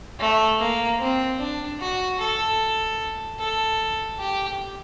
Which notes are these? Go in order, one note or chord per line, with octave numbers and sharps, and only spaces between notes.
A3
A#3
C4
D4
F#4
A4
A4
G4